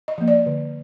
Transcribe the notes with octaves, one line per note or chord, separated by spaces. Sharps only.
D#5
F3 A#3
D5
D3